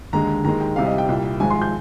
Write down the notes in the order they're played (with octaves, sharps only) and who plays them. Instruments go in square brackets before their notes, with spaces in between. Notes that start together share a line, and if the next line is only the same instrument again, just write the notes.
[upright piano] D#2 D3 G#3 A#5
D#2 D#3 G#3 A#5
G5
C2 C3 G3 F5
D#5
G5
C2 A#2 G3
G#1 G#2 F3 G#3 G#5
C6
G6